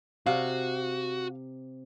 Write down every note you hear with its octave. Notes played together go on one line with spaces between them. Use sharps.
C3 F#4 F5